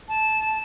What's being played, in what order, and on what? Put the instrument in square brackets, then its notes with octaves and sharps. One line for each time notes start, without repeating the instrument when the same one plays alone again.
[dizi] A5